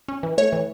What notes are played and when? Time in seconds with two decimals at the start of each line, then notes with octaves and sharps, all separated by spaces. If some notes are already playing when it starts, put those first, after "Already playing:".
0.08 C#4
0.23 E3
0.38 A3 C#5
0.53 E3